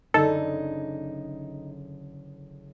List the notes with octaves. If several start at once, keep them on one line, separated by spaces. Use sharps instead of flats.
F#1 D3 D#4 G#4 A4